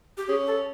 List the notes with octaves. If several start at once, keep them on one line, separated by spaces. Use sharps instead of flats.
G4
C#4 G#4
A4